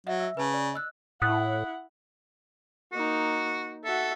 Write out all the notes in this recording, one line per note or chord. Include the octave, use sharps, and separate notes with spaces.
F#3 D#5 E5 F#5
E5 E6
C#3 B4 A5
D5
D#5 E6 F#6
A2 E4 F#5 D#6 F#6
A#3 D#4 F#4
F#4 A4 E5